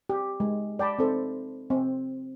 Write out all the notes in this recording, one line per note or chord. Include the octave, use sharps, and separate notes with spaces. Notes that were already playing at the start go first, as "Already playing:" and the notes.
G4
G#3
D5 G5 A5 B5
C4 D#4 A4 C5
C4